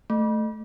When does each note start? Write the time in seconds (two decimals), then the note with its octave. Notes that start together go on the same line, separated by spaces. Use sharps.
0.10 A3